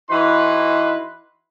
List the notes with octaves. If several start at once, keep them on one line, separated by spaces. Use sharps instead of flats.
E3 D#4 E4 F#4 B4 C6